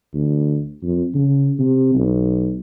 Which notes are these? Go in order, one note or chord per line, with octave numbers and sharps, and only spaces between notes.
D2
F2
C#3
C3
B1